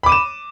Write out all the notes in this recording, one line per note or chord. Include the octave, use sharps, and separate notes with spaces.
B5 D6 D#7 E7